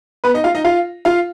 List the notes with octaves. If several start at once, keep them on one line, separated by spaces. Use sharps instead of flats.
B3 B4
D#4 D#5
F4 F5
D#4 D#5
F4 F5
F4 F5